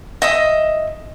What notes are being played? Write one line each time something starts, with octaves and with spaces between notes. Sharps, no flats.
D#5 E5 D#6